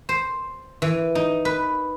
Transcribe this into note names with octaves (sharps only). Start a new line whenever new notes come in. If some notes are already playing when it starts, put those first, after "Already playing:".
C5
E3
D#4
B4